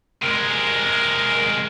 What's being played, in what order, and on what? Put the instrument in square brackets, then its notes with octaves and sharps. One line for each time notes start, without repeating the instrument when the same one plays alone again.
[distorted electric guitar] C3 G#3 [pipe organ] A#4